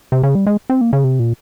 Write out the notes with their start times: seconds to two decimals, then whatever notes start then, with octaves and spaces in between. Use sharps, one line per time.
0.12 C3
0.23 C#3
0.35 G3
0.47 G#3
0.70 C4
0.81 A#3
0.93 C#3
1.04 C3
1.19 A#2